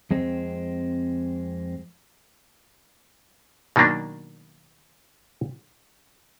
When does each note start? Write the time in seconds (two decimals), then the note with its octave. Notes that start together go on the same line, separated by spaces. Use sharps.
0.11 F2 G#3 C4
3.76 B2 D#3 F#3 A#3 D4